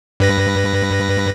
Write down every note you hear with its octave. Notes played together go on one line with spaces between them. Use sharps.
G2 B4 A#6